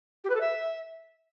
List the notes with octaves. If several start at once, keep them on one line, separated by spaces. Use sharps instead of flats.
G4
B4
A4
E5